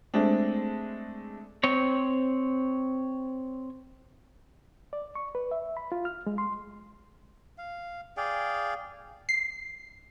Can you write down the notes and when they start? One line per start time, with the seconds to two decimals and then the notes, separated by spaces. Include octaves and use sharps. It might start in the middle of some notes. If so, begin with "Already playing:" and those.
0.14 G#3 A3 C4 D4
1.64 C4 C#5
4.93 D5
5.15 C#6
5.35 B4
5.51 E5
5.77 B5
5.92 F4
6.05 F6
6.27 G#3
6.38 C6
7.58 F5
8.17 G#4 D5 F5 G5
9.29 C7